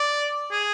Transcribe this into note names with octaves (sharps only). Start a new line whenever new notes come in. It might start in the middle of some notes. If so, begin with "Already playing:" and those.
Already playing: D5
G#4